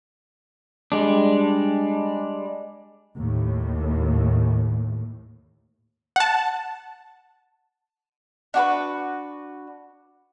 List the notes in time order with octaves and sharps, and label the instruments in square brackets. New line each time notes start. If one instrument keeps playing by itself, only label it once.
[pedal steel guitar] G3 G#3 D4
[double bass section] D#2 A2
[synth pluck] F#5 A5
[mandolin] D4 F#4 B4